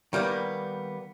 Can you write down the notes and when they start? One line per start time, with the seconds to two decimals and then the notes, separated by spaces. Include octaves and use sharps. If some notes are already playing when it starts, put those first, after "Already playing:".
0.13 D#3 G3 A#3 B3